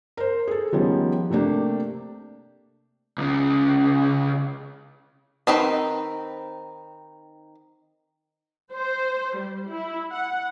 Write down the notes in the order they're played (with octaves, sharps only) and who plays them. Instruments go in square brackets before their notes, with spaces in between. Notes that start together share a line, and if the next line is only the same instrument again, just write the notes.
[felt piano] A#4 C5
G#4 A4
D#3 F3 G3 G#3 B3 C#4
C3 A3 A#3 D4 G4
[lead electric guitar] C#2 C#3
[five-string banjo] D#3 C4 D#4 B4
[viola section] C5
G3
E4
F#5